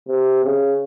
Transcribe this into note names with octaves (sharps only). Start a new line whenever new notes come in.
C3
C#3